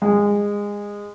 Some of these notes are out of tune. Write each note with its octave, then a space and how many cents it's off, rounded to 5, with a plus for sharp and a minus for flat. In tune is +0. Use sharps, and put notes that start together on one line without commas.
G#3 -20